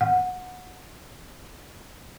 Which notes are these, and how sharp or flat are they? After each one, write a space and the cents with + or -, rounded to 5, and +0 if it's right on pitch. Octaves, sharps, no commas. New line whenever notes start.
F#5 -20